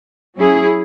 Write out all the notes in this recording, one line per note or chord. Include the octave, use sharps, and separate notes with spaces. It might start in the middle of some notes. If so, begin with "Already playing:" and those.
F#3 C#4 E4 G#4